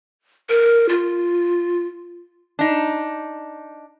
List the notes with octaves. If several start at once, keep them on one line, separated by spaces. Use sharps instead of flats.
A#4
F4
D4 D#4